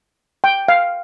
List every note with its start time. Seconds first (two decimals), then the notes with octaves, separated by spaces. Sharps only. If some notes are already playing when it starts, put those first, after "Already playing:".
0.44 G5
0.68 F5